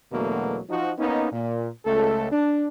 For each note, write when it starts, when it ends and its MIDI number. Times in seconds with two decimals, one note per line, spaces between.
0.13 0.60 40
0.13 0.60 47
0.13 0.60 50
0.13 0.60 54
0.13 0.60 57
0.13 0.60 58
0.70 0.92 53
0.70 0.92 63
0.70 0.92 66
0.99 1.30 58
0.99 1.30 59
0.99 1.30 61
0.99 1.30 63
1.32 1.69 46
1.85 2.29 37
1.85 2.29 57
1.85 2.29 69
2.32 2.68 62